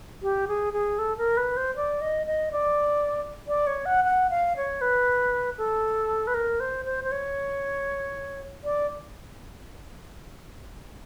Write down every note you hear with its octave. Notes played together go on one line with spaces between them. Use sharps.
G4
G#4
G#4
A4
A#4
B4
C5
D5
D#5
D#5
D5
D5
C#5
F#5
F#5
F5
C#5
B4
A4
B4
A#4
C5
C5
C5
C#5
D5